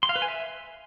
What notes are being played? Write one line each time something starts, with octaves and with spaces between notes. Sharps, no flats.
C6
F5
B4
G#5
E5